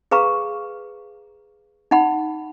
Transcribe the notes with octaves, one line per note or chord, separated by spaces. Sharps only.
G#4 B4 F5 A#5 C#6
D#4 F#5 B5